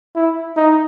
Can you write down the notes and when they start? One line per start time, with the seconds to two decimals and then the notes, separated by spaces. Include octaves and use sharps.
0.16 E4
0.57 D#4